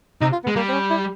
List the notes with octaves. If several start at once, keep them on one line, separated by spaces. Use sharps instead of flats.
C3 D#4
F4
B3
G#3
G3 A#3
C4
C#4
E4